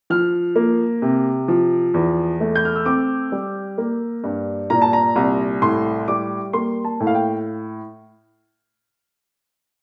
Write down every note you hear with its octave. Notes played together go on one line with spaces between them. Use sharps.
F3 F6
A#3
C3
F3
E2
A3
G6
F6
E6
C4 D6
G3
A#3
G2
A#2 A#5
A5
A#5
C2
A2 C6
G3 D6
A#3 C6
A5
A2
F5
G5